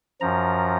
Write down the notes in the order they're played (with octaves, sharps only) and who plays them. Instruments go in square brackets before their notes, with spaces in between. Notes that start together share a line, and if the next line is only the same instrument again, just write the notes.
[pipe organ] F#2 F3 A#5